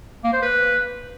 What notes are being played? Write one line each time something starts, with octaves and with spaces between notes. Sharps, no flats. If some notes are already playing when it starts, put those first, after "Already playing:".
A#3
C5
B4